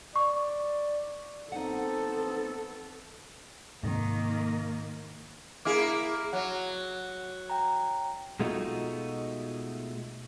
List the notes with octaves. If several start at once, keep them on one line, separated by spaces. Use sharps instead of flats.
D5 C#6
B3 C4 D#4 A4 F#5
G#2 C3 D#3 A#3
A#3 E4 G#4 D6
F#3 F#5
G5 A#5
B2 G#3 A3 D#4 F4 F#4